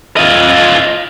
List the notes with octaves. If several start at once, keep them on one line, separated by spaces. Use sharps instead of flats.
F4 D#5